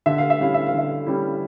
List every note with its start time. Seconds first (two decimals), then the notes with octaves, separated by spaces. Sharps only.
0.06 D3 E5
0.18 F5
0.30 E5
0.39 G3 C#4 E4 F5
0.54 E5
0.66 F5
0.73 D3 E5
1.06 G3 C#4 E4